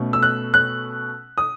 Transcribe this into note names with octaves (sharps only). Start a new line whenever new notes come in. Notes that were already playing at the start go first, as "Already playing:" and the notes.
Already playing: B2 A3 C#4
E6
F#6
F#6
D#6